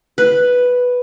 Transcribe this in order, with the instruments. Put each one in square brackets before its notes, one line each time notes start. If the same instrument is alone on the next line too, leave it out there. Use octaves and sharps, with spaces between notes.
[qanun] B4